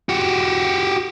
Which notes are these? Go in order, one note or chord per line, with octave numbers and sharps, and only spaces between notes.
F#4 G4